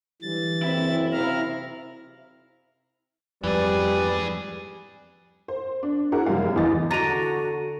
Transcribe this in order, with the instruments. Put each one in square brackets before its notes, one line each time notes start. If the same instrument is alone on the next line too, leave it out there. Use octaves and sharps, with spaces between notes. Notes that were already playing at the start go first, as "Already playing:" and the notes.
[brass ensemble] D3 F#3 G3 [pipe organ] E3 A6
[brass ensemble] F#1 [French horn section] C4 [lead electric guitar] E4 E5
[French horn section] C3 [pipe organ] F5 A#5 F6
[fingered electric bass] F2 G#2 [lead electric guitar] E3 G#4 [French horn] G3 [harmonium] B4 D5
[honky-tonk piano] C5
D4
E4 F#4 G#4 A#4 F#5
F1 F#2 G3 F5
E2 E3 D#5 A6
[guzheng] D3 D5 [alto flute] F#4 [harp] A#5 [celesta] A6 D#7 F7